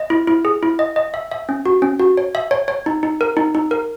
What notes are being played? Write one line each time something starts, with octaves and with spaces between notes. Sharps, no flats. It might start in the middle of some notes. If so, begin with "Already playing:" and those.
Already playing: D#5
E4
E4
G#4
E4
D#5
D#5
E5
E5
C#4
F#4
C#4
F#4
C#5
E5
C#5
C#5
D#4
D#4
A#4
D#4
D#4
A#4